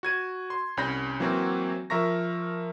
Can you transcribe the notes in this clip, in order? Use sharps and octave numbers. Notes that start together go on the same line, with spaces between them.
F#4 G#6 D#7
C6
C2 C#4 B5 G6 A#6
E3 F#3 A#3 C4 F#4
F3 A#4 E5 A#5 C#6 A#6